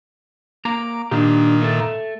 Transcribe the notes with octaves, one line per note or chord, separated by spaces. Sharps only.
A#3 A#5 D6
A#2 D#3 D4 G4
A3 A4